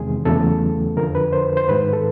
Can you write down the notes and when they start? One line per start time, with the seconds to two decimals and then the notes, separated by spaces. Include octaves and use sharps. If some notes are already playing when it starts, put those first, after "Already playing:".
Already playing: E2 C3 D#3 G#3 G#4
0.25 E2 C#3 F#3 A3 A4
0.97 F2 D3 F3 A#4
1.15 B4
1.32 C5
1.57 C5
1.68 G#2 D#3 G#3 B4
1.93 A4